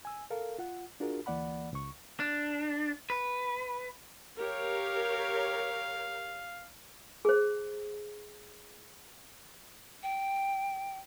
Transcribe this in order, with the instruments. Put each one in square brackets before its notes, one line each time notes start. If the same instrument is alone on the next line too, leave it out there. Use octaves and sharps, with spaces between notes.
[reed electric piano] G#5 E6
A4 A#4 F5
F4 F#5
D4 F4 F#4 G#4 A#4
D2 E3 A#3 D5 F#5 B5
C#2 C#6
[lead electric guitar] D4
B4
[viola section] G4 A#4 C#5 [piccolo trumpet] F5
[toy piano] G#4 C5
[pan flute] G5